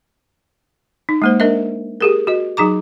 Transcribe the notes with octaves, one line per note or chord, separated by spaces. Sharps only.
D#4
G#3 A#3 C5
D4 A#4 D#5 E5
G4 G#4 A#4
F#4 D#5
F#3 D#4 G#4 A#5 D6